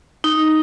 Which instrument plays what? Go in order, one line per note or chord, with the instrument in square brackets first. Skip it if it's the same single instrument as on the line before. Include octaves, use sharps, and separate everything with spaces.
[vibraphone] D#4